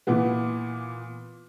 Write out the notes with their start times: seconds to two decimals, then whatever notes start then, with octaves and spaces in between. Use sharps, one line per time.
0.07 A#2 E3 B3